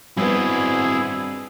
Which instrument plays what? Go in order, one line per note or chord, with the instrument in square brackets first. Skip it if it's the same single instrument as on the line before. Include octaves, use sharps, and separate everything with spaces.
[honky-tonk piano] G2 B3 [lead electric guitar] C4 F#4 [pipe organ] E4 G#4